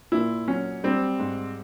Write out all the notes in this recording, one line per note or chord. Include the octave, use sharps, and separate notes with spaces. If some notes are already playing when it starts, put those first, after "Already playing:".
A#2 E4
F#3 C#4
G3 C4
G#2